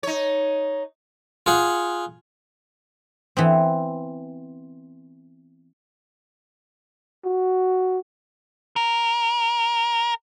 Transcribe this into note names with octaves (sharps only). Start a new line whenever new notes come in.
D#4 C#5
F4 G#4 F#5
E3 B3 C4
F#4
A#4